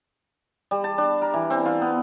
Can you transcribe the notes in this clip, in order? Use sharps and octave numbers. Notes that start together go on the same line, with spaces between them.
G3
A5
D4
A#4
E3
C4
F4
B3